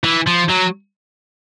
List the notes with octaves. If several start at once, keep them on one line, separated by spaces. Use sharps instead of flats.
E3
F3
F#3